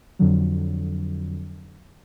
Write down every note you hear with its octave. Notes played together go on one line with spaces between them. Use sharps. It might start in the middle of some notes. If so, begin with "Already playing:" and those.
F2 D3 F#3